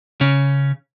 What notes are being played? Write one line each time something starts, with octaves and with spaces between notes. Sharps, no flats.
C#3 C#4